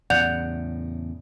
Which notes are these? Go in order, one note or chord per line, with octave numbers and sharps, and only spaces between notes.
E2 A2 C#3 D5 F#5 G6 F7